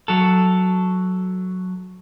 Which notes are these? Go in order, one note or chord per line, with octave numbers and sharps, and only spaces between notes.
F#3 A4